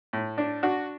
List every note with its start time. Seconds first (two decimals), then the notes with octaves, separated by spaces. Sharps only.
0.13 A2
0.38 D4
0.63 D4 F#4